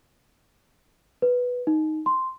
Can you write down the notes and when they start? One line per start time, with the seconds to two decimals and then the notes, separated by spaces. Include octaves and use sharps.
1.22 B4
1.67 D#4
2.06 C6